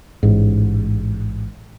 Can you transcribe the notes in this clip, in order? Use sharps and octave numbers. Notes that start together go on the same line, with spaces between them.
A1 G#2